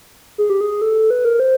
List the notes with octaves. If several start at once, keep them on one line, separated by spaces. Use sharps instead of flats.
G#4
G4
G#4
A4
B4
A#4
C5